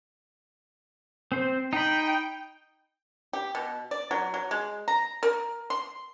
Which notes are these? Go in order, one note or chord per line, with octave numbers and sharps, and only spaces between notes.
C4 C5
D#4 G5 B5
G4
B2
D5
F#3
F#3
G#3
A#5
A#4
C6